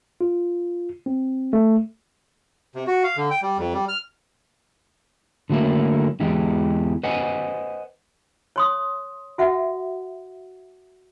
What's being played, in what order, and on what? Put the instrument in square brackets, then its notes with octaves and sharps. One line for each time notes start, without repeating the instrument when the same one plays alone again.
[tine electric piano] F4
C4
A3
[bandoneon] C3
F#4
F5
D3
G5
G3
F2
G3
F6
[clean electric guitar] D3 F#3 A3 A#3 E4
E2 E3 G#3 G4
B4 C5 D#5 F#5 G#5
[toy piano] C#5 C6 D#6
F#4 E5 F#5